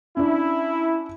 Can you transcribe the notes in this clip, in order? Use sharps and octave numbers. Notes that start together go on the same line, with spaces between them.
C#4 D4 E4